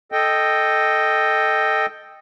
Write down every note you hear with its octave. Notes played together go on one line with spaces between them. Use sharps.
A4 D#5 G5